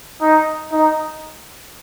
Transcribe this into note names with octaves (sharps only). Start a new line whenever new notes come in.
D#4
D#4